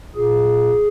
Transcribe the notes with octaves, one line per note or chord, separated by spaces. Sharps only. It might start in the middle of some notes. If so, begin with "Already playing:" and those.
A#2 G#4